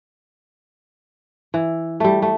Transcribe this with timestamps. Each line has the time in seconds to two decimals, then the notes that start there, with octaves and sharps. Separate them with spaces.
1.54 E3
2.00 G3 A3
2.22 A3